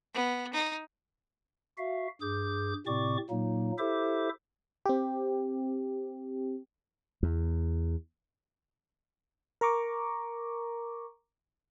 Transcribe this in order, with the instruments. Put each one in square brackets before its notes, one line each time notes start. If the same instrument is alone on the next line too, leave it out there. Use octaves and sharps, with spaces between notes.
[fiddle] B3
D#4
[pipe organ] F#4 E5 F5
G2 G#4 D6 G6
A2 C3 C4 D5 C#6 D6
A#2 F#3 A#3 D#4
E4 G4 A4 C5 E5 D6
[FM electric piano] C4 G4
[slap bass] E2
[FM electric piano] A#4 A#5 C#6 D6